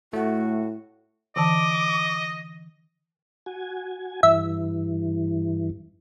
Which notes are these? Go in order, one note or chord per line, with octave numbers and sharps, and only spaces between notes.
A2 A3 F#4
D3 E3 D#5 A5 D6
F#4 G#5
G2 E3 E5